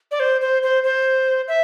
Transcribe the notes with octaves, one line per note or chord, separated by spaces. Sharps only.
D5
C5
C5
C5
C5
E5